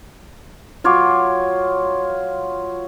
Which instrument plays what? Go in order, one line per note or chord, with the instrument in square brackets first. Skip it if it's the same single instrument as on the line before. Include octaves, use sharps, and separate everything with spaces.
[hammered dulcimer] F#3 F4 C#5 D6